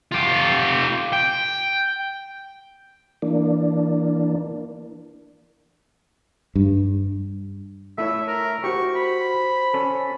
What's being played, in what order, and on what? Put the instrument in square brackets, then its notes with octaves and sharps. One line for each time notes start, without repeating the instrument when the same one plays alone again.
[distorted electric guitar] F4 G4
G5
[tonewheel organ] E3 A#3 D4
[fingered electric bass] G2
[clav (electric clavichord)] A3 E4 C#5 [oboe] E5
[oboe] A#4
[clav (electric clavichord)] F#4 G4 [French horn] C5 [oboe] C#6
[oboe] B5
[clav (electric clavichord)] C#4 A4